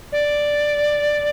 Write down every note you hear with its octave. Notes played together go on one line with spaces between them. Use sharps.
D5